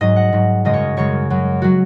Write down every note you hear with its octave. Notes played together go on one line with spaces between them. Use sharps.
G#2 F#3 D#5
F#5
G#2 F#3
F#2 C#3 G#3 D#5
C#5
F#2 C#3 G#3 C#5
F#2 F#3
F#3 F#4